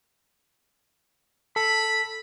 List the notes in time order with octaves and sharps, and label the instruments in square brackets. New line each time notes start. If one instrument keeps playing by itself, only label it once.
[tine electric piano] A4 [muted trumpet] B5